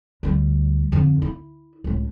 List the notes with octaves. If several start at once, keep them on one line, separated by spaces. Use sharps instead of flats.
D2 G3
F2 D3
E4
C#2 A2